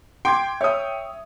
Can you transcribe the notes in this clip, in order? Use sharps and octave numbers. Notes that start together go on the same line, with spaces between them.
G5 C6 D6 G#6
C#5 E5 D#6